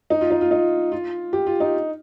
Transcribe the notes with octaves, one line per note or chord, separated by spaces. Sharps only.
D#4
F4
D#4
F4
D#4
F4
G4
F4
D#4